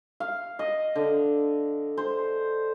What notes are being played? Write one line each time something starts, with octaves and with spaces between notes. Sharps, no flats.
F5
D#5
D3
C5